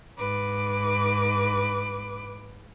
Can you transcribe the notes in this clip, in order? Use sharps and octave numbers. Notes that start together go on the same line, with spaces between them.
G#2 B4 D6